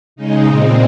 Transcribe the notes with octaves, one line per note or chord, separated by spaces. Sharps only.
C#3 G#3 D#4
A#2 G#3 C4